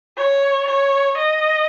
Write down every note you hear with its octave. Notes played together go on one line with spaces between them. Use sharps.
C#5
C#5
D#5